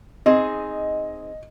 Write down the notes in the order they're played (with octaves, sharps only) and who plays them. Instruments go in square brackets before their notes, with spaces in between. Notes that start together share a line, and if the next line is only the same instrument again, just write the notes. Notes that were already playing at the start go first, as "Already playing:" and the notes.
[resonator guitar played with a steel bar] C4 D#4 G#4 [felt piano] D#5